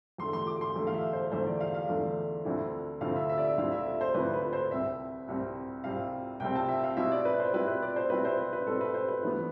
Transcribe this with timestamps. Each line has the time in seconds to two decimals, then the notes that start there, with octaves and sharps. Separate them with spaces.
0.18 E2 D3 A3 C6
0.33 C6
0.47 D6
0.61 C6
0.76 E2 D3 A3
0.87 F5
0.94 E5
1.13 C5
1.32 E2 D3 A3 C5
1.46 D5
1.61 F5
1.75 F5
1.89 E2 D3 A3
2.45 D2 D3 F3 C4 E4
3.01 D2 D3 F3 C4 E4 F5
3.16 E5
3.29 E5
3.38 D5
3.44 E5
3.57 D2 D3 F3 C4 E4 F5
3.72 E5
3.86 E5
4.01 C5
4.14 D2 D3 F3 C4 E4 B4
4.34 B4
4.53 C5
4.71 C2 C3 G3 C4 E5
5.28 C2 C3 G3 C4
5.84 C2 C3 G3 C4 F5
6.40 C2 C3 G3 C4 G5
6.55 A5
6.68 E5
6.84 F5
6.97 B2 G3 C4 E4 E5
7.12 D5
7.25 B4
7.40 C5
7.54 B2 G3 C4 E4 B4
7.68 B4
7.82 D5
7.96 C5
8.10 B2 G3 C4 E4 B4
8.25 C5
8.38 B4
8.53 B4
8.66 B2 G3 C4 E4 A4
8.81 B4
8.94 C5
9.08 B4
9.23 G2 E3 G3 B3 B4